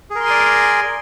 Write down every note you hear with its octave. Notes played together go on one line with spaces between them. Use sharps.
G#4 A#4 D5 G#5 C6